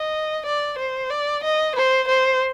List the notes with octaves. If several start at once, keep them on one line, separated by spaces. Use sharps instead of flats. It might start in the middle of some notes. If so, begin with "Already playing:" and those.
Already playing: D#5
D5
C5
D5
D#5
C5
C5